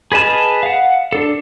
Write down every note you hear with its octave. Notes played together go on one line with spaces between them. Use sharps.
G#4 B4 D#5 A5 F6
F5 F#5
D4 A4